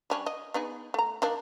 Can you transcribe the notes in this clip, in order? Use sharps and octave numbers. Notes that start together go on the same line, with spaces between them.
G3 C#4 D4
D#5
B3 D#4 G#4
A3 A#5
D#3 A#3 D4